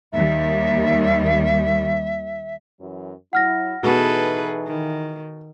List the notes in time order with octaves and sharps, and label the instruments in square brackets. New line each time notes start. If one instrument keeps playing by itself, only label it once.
[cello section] D#2 G3 [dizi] E5
[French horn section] F#2 E3 F#3
[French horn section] F#3 E4 [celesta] F#5 F6 A#6
[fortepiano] B2 [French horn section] E3 D#4 [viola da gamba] G#4 A4 B4
[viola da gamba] D#3